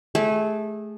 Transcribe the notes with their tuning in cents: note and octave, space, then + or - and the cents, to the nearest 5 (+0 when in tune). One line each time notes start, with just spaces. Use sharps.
A3 -25 G#4 -15